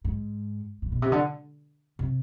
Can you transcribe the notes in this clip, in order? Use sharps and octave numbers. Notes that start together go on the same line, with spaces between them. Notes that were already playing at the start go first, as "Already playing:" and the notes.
G#2
A2
B2
C3
D3
C3